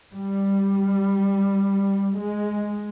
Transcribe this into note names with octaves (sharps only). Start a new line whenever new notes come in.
G3
G#3